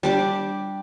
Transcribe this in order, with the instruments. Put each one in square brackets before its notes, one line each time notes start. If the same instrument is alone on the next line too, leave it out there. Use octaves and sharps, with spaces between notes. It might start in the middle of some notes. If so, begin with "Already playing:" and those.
[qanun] G3 D4 G4